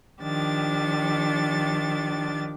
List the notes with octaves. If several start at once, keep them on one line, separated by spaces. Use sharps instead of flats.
D#3 F3 D4 G4 A6